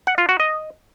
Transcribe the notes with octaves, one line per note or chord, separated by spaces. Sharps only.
F#5
F4
F#4
D#5